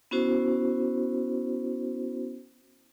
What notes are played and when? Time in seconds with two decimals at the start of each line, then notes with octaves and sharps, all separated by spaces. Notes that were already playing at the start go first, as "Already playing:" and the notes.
0.11 B3 C#4 E4 F#4 C5